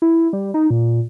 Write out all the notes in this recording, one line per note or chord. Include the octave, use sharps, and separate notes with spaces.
E4
G3
D#4
A#2